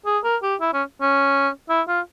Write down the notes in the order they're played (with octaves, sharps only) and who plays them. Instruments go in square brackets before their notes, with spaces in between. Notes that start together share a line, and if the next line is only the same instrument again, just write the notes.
[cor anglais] G#4
A#4
G4
E4
C#4
C#4
E4
F4